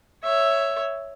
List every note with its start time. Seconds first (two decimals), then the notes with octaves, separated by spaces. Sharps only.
0.23 C#5 E5